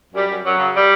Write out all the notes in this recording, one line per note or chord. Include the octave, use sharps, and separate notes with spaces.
F#2 G3
F#2
F#2 F#3
C#3
G3